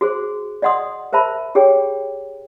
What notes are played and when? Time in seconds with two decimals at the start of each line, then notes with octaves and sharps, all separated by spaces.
0.01 F#4 G#4 C5
0.62 D5 D#5 F#5 C6 D#6
1.13 A#4 C5 E5 A5 B5
1.55 G4 G#4 C#5 G5